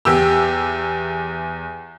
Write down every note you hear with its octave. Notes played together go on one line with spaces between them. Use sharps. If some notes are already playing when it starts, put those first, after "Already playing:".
E2 G4 E6